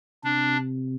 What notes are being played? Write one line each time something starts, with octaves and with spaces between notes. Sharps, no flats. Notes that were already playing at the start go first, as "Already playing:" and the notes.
C3 D4